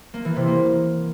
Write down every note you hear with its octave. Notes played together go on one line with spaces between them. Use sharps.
A#3
E3
C3
A#3